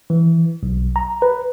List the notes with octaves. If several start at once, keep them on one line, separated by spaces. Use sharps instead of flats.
E3
B1
A#5
B4